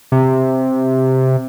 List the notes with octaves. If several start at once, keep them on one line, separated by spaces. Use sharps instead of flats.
C3